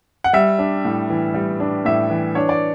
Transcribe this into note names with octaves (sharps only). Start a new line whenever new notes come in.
F#5
G3 E5
D4
A2
E3
G3
D4
A2 E5
E3
D4 C#5
D5